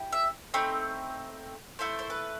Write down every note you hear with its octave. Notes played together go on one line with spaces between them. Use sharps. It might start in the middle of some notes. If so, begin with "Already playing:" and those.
Already playing: E4 G4
E5
A3 C4 D#4 B5
A3 E4 A4 C5
C5
B4